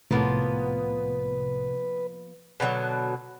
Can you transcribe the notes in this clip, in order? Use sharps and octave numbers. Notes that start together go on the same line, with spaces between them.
C2 A2 C3 F3 A#3 B3 B4
B2 D3 F3 F#3